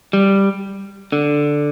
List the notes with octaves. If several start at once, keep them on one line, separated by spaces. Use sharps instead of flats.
G3
D3